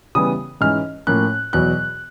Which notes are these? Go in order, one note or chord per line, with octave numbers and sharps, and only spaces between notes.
C#3 E3 G3 B3 D#6
G#2 E3 G#3 C#4 F6
A2 F3 A#3 C#4 F#6
E2 B2 F#3 F#6